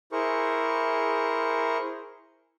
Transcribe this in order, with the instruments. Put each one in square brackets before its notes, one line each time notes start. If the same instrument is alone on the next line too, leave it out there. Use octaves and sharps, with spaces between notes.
[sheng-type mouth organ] E4 G#4 A#4 C5 C#6